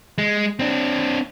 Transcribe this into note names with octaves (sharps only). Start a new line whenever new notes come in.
G#3
C4 D4